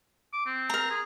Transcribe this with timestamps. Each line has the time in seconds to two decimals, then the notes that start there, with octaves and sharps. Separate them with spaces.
0.33 D6
0.46 C4
0.70 A#4 A#5
0.90 G#4